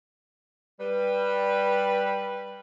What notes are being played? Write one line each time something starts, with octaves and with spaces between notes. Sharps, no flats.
G3 B4